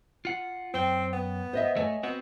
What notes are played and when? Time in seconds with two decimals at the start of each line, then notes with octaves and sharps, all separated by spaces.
0.25 F4 F#5
0.74 F#2 C4 G5
1.13 B3
1.53 C5 D#5 E5
1.76 A3 C#5 D#5 G#5
2.03 B3 C4 F#4